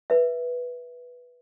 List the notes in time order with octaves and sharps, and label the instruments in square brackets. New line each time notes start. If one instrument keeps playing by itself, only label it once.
[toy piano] B4 E5